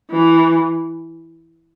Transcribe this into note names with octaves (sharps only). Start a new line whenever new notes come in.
E3